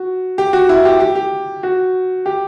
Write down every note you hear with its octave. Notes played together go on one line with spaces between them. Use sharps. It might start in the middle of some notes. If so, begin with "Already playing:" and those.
Already playing: F#4
G4
F#4
E4
G4
G4
G4
F#4
G4